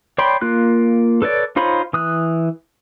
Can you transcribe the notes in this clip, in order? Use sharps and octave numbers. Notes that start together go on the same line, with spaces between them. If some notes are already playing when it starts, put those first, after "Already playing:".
C#5 D5 G5 B5 C6
A#3 F4 F#6
A4 B4 C#5 D5
D#4 F4 C5 C#5 B5
E3 D#6 F#6